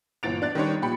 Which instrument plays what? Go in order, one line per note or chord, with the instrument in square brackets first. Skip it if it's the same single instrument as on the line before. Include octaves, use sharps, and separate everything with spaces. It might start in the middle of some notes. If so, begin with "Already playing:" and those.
[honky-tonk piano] G1 A#2 E3 A6 D7 F7
D4 F#6 A6
D#3 G3 D4 C#5
A#2 F3 G4 B5 C#7